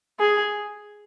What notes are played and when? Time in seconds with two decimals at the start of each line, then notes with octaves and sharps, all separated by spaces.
0.20 G#4